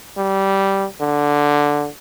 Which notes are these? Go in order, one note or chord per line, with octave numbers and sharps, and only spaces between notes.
G3
D3